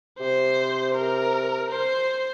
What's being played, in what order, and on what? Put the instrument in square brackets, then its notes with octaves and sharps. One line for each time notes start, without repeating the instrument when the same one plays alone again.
[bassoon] C3 [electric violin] C5
[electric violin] A#4
C5